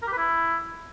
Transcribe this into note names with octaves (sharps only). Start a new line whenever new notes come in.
A#4
G4
B4
E4